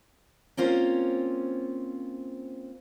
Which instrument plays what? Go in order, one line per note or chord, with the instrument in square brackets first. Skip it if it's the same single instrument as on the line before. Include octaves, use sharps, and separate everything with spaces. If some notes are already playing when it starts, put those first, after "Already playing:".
[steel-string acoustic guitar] A#3 C4 C#4 F4 C5